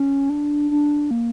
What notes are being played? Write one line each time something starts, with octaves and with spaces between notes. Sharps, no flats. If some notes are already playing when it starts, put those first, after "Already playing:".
Already playing: C#4
D4
D4
A#3